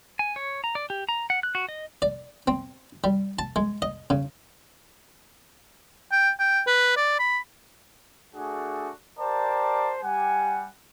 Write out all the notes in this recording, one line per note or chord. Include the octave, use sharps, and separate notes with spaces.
G#5
C#5
A#5
D5
G4
A#5
F#5
F#6
F#4
D#5
D5
C4
G3
A5
G#3
D#5
C#3
G5
G5
B4
D5
B5
A3 D4 F#4 G#4
G4 A#4 C5 D5 A5
G3 G4 F#5 G#5